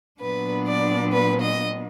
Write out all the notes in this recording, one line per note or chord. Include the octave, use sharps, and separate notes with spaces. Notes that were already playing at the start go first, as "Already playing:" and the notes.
A#2 F#3 B3 D4 B4
D5
B4
D#5